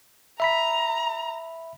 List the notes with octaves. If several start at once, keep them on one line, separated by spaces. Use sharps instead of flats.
E5 A#5 B5 B6